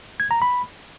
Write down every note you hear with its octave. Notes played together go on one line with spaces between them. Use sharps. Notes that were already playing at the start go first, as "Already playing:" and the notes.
G#6
A#5
B5